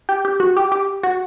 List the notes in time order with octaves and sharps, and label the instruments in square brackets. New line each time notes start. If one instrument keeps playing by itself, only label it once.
[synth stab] G4
G4
F#4
G4
G4
F#4